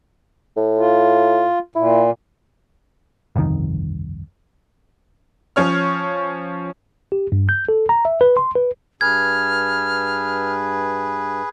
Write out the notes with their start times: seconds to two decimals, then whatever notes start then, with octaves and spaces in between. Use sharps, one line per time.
0.57 A2
0.78 F4
1.75 A#2 E4
3.36 G1 C2 F2 D#3
5.56 F3 C#4 C#5 F6
7.12 G4
7.32 G2
7.49 G6
7.69 A4
7.89 A#5
8.05 E5
8.21 B4
8.37 C6
8.55 B4
9.01 G2 G#4 B4 F6 G#6